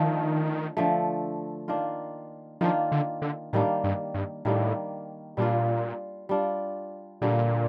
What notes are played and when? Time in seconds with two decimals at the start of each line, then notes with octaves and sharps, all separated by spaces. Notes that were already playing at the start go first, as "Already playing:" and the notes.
Already playing: D3 D#3 F3 A3
0.77 D3 F3 A3
1.68 D#3 A#3 D4 F4
2.61 D#3 F3 A#3 D4 F4
2.92 D3
3.22 D3
3.53 A2 D#3 G3 A#3 D4
3.84 G2
4.14 G2
4.45 A2 D#3 G3 A#3 D4
5.37 A#2 G3 D4 F4
6.29 G3 D4 F4
7.22 A#2 D3 G3 A#3